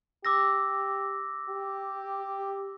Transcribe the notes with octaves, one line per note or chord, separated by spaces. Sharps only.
G4 D6 E6 A#6
G4